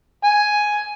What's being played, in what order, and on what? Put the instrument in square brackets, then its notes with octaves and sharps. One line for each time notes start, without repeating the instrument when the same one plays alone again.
[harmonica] G#5